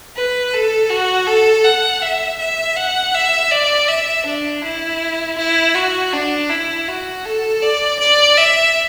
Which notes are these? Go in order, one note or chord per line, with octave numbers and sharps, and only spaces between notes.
B4
A4
F#4
A4
F#5
E5
E5
F#5
E5
D5
E5
D4
E4
E4
F#4
D4
E4
F#4
A4
D5
D5
E5